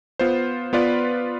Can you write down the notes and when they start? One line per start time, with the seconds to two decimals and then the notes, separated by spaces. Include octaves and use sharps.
0.19 B3 F4 C5
0.73 B3 F4 B4 D5